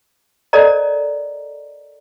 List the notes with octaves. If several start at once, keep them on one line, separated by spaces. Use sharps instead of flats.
A4 A#4 C5 D5 D#5 A#5